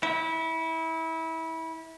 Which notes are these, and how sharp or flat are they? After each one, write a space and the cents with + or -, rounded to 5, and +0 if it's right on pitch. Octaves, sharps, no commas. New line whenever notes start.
E4 -25